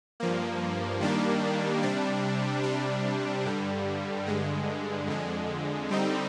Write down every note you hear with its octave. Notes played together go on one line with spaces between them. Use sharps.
G2 F3 A#3
D#3 G3 A#3 D4
C3 G3 D4
C3 G3 D4
G2 D3 G3
G2 D3 G#3
F2 D3 G#3
D3 G3 C4 D#4